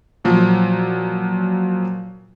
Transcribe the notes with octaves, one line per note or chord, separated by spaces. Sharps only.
A#2 F3 F#3